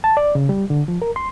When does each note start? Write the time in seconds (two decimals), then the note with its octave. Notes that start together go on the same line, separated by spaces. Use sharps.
0.04 A5
0.17 D5
0.35 C#3
0.49 G3
0.70 D3
0.88 F3
1.02 A#4
1.16 C6